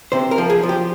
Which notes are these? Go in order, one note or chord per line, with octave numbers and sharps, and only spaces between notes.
C3 C5
A#4
F3
G#4
F3
G4